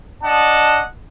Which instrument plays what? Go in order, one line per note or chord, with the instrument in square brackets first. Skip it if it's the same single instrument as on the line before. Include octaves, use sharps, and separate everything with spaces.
[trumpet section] D4 D#5 F#5 A5